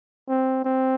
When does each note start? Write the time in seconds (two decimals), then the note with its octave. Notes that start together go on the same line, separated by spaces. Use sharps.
0.28 C4
0.64 C4